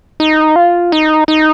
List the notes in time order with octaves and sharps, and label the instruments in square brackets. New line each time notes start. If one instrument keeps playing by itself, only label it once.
[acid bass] D#4
F4
D#4
D#4